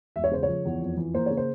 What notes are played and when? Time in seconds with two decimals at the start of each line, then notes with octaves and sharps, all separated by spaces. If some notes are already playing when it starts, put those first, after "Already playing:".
0.16 E1 E5
0.24 C#5
0.31 C#3 C5
0.43 F3 C#5
0.65 E2
0.82 F2
0.97 E3
1.14 A#3 C5
1.26 C#3 C#5
1.37 C5